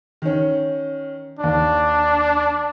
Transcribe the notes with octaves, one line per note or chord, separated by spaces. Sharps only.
D#3 C#4
D#2 D4 D5